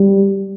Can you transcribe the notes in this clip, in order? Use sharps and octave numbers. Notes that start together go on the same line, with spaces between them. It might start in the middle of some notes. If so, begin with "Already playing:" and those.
Already playing: G3